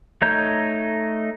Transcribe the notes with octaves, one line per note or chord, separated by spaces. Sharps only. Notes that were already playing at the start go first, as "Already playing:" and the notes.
A3 D#4 C#5 A#5 G6